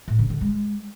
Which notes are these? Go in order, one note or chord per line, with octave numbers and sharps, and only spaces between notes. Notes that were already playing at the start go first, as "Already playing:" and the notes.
A2
C#3
D3
G#3